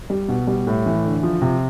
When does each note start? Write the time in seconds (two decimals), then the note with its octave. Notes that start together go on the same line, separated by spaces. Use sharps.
0.10 G3
0.28 B2
0.47 G3
0.67 A2
0.86 E3
1.05 D3
1.23 F3
1.42 C3